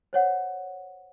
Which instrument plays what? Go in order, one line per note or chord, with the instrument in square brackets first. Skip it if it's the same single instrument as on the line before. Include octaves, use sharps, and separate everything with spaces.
[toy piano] C5 C#5 F#5